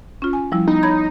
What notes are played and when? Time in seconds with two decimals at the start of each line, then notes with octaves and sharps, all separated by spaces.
0.22 C#4 F4
0.33 G#5
0.52 F3 G3 E4
0.68 B3 D#4
0.83 C#5 B5 G#6